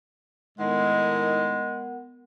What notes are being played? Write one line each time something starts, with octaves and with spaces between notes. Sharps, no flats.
A2 D#3 G#3 B3 A#4 F#5